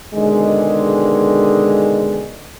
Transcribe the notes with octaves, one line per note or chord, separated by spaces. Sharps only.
B2 D3 D#3 G#3